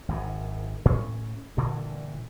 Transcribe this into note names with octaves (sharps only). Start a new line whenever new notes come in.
G#1 F#2 C3 D#3
A2 C#4
G2 A#2 D3 E3